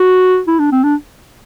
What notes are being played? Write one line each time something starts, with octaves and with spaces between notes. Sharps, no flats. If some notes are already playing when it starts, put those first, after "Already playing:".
Already playing: F#4
E4
D4
C4
D4